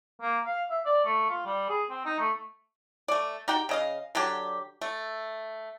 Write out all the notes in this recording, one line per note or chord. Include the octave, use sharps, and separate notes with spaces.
A#3
F5
E5
D5
A3
F4
G3
G#4
C4
D#4
A3
A3 D5
D#4 F#4 G4 G5
C#3 D#5 F5
D3 F#3 D4 G4
A3